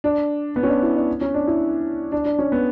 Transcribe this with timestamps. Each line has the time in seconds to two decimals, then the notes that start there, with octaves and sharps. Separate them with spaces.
0.04 D4
0.56 B3
0.63 C#4
0.69 D4
0.82 E4
0.96 D4
1.21 C#4
1.34 D4
1.47 E4
2.12 D4
2.25 D4
2.39 C#4
2.52 B3